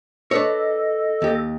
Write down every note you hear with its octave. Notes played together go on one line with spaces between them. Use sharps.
D4 A4 B4 C#5 D#5
D#2 G4